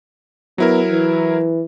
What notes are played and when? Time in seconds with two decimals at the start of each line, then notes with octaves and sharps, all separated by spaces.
0.58 F#3 B3 E4 A#4
0.91 E3